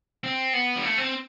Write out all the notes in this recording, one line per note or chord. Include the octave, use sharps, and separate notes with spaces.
C4
B3
G3
A3
C4